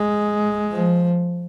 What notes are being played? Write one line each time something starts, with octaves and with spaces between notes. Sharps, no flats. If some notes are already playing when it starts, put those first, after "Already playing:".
Already playing: G#3
F3